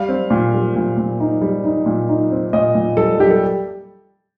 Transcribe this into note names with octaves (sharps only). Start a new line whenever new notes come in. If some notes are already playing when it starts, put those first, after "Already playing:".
Already playing: G3 F5
C4
A#2
G3
A#2
A#2
D#4
G3
D#4
A#2
D#4
C4
A#2 D#5
A#2
G3 A4
G3 G4
A4